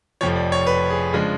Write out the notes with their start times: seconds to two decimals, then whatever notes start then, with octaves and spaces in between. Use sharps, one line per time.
0.21 F1 F2 F3 C#5
0.36 D5
0.52 C#5
0.67 B4
0.91 G#4
1.13 C#3 F3 G#3 D4